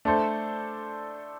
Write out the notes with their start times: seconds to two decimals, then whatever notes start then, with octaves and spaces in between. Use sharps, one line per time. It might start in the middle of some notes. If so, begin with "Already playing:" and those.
0.05 A3 D4 A4 C5